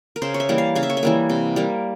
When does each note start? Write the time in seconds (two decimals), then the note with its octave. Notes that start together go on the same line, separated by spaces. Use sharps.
0.16 A#4
0.22 C#3 C5
0.34 C#5
0.40 E5
0.49 E3 G3 A#3
0.58 F5
0.75 C#3 F5
0.83 E5
0.90 C#5
0.97 E5
1.03 E3 G3 A#3
1.29 C3
1.56 G3 A#3